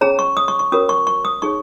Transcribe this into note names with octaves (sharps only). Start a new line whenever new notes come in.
C#4 G#4 C#5 A#5
C#6
D#6
C#6
C#6
C#4 F#4 A#4 C#5 D#6
C#6
C#6
D#6
D#4 G#4 C#5 C#6